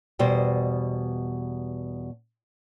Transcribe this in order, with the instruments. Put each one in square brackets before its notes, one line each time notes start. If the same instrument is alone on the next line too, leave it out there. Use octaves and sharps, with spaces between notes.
[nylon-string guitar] E2 B2 G3 C5 D#5